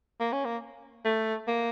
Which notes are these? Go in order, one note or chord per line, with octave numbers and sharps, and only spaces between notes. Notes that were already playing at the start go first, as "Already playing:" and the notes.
A#3
C#4
A#3
A3
A#3